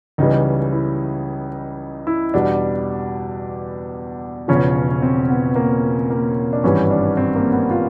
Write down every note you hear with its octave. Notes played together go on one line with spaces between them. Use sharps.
C#2 C#3 E3 G3 D#4
E4
E4
E2 B2 G3 D4
E1 E2 C#3 F3 C#4
C4
B3
A#3
A#3
D4
G#1 G2 E3 G3 C#4
D4
C4
A#3
B3
F4